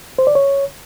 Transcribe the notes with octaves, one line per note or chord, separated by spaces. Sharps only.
C5
D5
C#5